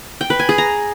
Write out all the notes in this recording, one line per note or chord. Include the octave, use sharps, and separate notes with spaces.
G5
B4
G#5
G#4
A#5